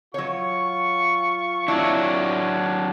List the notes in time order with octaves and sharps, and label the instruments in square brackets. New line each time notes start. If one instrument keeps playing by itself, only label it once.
[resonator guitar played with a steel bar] F#3 C#5 [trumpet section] F4 C#6
[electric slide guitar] F#3 D4 [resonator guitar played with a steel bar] E4